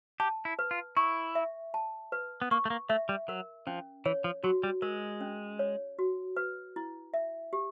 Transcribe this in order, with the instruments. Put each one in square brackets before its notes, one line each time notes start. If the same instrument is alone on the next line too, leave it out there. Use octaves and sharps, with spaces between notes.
[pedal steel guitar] G4 [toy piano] A5
[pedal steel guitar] E4
[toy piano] B4
[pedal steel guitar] F4
[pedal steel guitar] E4 [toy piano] C#6
[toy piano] E5
A5
B4
[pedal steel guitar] B3
[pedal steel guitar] A#3 [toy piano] C#6
[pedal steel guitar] A3
A#3
[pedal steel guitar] A3 [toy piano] E5
[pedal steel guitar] G3
[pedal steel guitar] F#3 [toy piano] A#4
[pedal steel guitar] F3 [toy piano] C#4
[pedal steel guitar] E3 [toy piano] C#5
[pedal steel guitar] F3
[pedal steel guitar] F#3 [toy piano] F#4
[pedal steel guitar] G3
[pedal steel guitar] G#3 [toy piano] A#4
[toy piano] C#4
C#5
F#4
B4
E4
E5
G4